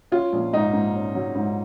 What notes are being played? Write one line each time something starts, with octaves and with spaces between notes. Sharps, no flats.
C#4 F4
A#1
G#2 D#4
G#2
C#4
F#3
G#2